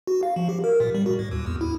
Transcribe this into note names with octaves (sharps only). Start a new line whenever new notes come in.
F#4
F5
F3
G4
A#4
A#2
G3
F#4
A2
D#2
E2
E4